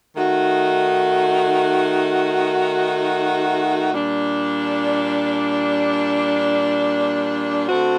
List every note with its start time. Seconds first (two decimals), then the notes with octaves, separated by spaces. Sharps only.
0.16 D#3 A3 D#4 F#4
3.93 A#2 G3 D4
7.69 D3 A3 C4 F#4